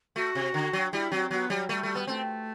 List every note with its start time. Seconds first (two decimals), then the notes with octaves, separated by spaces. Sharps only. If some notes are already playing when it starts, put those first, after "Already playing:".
0.16 A3 F#4
0.35 C3
0.54 D3
0.73 F#3
0.92 G3 E4
1.12 F#3 C4
1.31 F#3 B3
1.50 F#3 G3
1.69 G3 A3
1.83 A3
1.95 B3
2.07 A3 C4